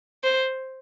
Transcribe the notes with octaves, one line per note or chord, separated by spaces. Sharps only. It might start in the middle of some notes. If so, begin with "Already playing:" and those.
C5